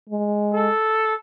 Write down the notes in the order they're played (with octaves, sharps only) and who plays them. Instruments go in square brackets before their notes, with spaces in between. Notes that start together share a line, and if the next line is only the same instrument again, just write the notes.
[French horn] G#3
[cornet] A4